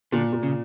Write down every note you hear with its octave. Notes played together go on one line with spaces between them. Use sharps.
A#2 D3
A#2
C#3